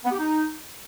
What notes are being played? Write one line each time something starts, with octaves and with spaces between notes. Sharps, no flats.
B3
G4
D#4